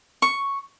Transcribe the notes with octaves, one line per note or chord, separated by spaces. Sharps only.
C#6